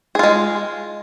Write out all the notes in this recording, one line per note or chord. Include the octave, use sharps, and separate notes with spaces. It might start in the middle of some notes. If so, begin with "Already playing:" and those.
G#3 F4 G#4